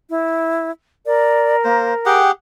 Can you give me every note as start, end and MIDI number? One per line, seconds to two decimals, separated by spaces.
0.10 0.71 64
1.06 2.20 70
1.06 1.56 74
1.64 1.93 58
1.64 1.94 72
2.06 2.31 67
2.06 2.31 68
2.06 2.31 78
2.06 2.29 79